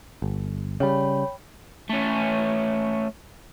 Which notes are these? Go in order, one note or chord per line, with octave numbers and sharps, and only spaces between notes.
G1
C#3 G3 C#5 G5 B5
A3 C#4